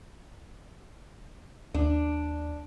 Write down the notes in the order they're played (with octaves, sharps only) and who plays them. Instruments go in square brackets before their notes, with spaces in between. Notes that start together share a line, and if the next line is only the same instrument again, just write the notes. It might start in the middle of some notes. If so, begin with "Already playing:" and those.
[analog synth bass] D#2 [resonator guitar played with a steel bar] D4